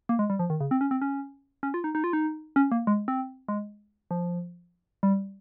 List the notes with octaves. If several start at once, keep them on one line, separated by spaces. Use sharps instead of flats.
A#3
G#3
G3
F3
D#3
C#3
C4
C#4
C4
C#4
C#4
F4
D#4
D#4
F4
D#4
C#4
A#3
G#3
C4
G#3
F3
G3